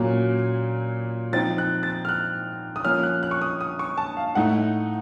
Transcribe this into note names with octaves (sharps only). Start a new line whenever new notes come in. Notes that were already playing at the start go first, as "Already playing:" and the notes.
Already playing: A#2 F#3 A#3 C#4
F3 C4 D#4 A6
F#6
A6
F6
F#6
D#6
F3 A#3 C#4 F6
F#6
F#6
C#6
D#6
D#6
C#6
A5
F5
A2 A3 D#4 F#5